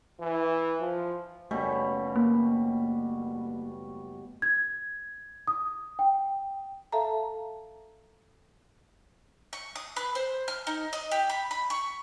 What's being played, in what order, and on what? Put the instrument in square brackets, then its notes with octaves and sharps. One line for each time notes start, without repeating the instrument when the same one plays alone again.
[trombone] E3
F3
[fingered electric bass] F#1 A3 [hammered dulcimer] B2 G3 C#4
[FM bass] A#3
[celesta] G#6
D#6
G5
[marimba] A4 E5 F5 A5 A#5
[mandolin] C#6
D#6
B4
C5
F6
D#4
D#5
G4
B5
B5
C#6